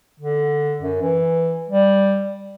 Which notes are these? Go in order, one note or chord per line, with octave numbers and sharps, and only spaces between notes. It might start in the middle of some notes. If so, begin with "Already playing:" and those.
D3
F#2
E3
G3